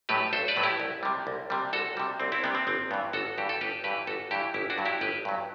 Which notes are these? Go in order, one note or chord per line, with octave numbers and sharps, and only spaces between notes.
A2 F#3 A3 G4 B4
B1 A4 C5
B4 D5
A2 F#3 A3
E4 G4
C2
C3 G3
C2
C3 G3
C2 F#4 A4
C3 G3
C2 C4
C4 E4
C3 G3 B3 D4
C4
G1 C4
G2 E3 B3
G1 F#4 A4
G2 E3 G4
A4
G1 G4 B4
G2 E3 G4 B4
G1 F#4 A4
G2 E3 E4 G4
G1 E4 G4
D4 F#4
G2 F#3
E4 G4
G1 G4 B4
G2 F#3